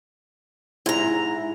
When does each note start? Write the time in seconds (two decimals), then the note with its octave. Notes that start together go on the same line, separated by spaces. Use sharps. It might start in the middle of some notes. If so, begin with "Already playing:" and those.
0.86 G#2 E4 A#5